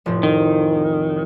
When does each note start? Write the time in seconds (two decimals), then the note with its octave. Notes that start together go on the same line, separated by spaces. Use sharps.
0.06 F1 A2 F3
0.23 D#3